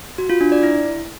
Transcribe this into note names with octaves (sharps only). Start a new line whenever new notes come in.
F#4
F4
D4
D5
E4